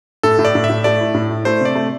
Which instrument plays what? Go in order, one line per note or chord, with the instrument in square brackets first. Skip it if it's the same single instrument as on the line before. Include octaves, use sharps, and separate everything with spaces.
[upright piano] A2 [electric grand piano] A4
[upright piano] A2
[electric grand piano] D5
[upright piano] A2
[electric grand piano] E5
[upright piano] A2
[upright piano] A3 [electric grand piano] D5
[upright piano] E4
A2
E4
[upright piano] A3 [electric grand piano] C5
[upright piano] C3 [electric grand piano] D5
[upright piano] A3